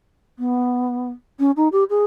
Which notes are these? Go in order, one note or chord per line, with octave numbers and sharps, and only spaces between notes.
B3
C#4
D#4
G4
G#4